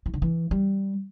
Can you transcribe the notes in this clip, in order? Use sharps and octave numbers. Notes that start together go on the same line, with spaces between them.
E3
D3
E3
G3